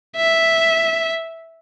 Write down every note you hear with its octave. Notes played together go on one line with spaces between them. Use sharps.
E5